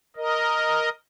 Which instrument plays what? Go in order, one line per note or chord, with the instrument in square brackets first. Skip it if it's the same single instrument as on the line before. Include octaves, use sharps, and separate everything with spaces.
[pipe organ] A#4 D#5